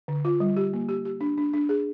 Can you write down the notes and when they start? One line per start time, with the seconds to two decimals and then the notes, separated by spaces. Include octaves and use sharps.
0.08 D3
0.25 F4
0.40 G3
0.56 G4
0.73 A#3
0.89 G4
1.05 G4
1.21 D4
1.38 D4
1.53 D4
1.69 G#4